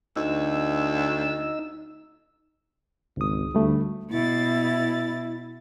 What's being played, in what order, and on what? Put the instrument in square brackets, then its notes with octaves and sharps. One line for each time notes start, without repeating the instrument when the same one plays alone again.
[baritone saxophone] D2 [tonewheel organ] D#4 E6
[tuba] G#1 [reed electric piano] C#2 D#6
[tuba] D2 [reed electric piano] G3 A3
[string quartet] B2 A6 [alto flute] E4